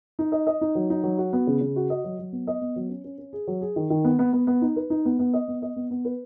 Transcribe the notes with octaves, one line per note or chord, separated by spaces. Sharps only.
D#4
D#5
D#5
D#4
F#3
D#4
F#3
F#4
B3
C#3
C#3
F#4
D#5
F#3
F#3
B3
D#5
B3
F#3
C#4
C#4
C#4
G#4
F#3
G#4
D#3
D#3
B3
B3
B3
B3
D#4
B4
D#4
B3
B3
D#5
B3
D#5
B3
B3
B4